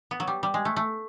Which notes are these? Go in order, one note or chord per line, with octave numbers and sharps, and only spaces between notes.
B3
F#3
G3
G3
G#3
A3
A3